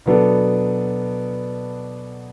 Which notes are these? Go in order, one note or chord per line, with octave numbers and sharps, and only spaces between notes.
B2 F#3 B3 D4 A4